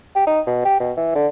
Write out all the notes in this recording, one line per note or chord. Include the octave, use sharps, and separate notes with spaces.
G4
D#4
B2
G4
B2
E3
D3